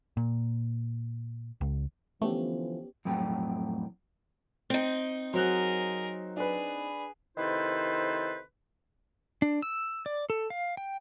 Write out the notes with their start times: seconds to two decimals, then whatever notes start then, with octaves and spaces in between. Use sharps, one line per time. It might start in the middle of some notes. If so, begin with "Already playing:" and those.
0.17 A#2
1.61 C#2
2.22 D3 E3 F3 A3 B3 C#4 G4
3.05 F2 A2 F#3 G5
4.70 C4 D#4
5.34 F#3 G#4 A#4 C5 F#6
6.37 D4 G#4 B4
7.38 C3 D#3 E4 A4 B4 C5
9.42 D4
9.62 E6
10.06 D5
10.30 A4
10.50 F5
10.77 G5